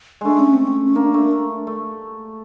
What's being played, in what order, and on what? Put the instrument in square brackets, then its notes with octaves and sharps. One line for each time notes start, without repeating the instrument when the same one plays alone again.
[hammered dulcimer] G#3 A3 [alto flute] D4
[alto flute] C#4
C4
C#4
C#4
[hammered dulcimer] A#3 [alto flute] D4
[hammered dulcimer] A3
A3